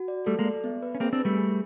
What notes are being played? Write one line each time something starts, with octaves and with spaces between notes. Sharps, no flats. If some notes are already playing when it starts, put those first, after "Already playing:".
Already playing: F#4
D5
G3 A3 A4
G#3 A#3
D5
B3
B4
C#4
A#3 C4 G#4
C4 D4
B4
G3 A3
G#4